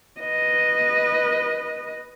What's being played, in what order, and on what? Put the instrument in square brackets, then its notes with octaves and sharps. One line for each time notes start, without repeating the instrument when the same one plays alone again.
[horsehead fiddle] B4 D#5